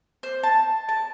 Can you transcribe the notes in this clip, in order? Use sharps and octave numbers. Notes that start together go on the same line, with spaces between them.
C5
A5
A5